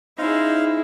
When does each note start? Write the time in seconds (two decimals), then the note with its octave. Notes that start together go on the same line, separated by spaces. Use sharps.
0.18 C#4 D#4 E4 G#4 C5 F5